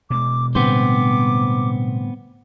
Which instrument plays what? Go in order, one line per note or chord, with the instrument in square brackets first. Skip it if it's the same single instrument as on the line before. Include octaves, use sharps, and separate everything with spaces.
[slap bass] B2 G#3 [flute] D6
[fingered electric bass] A2 D3 G3 [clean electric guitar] B3 C4 C5 [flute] D6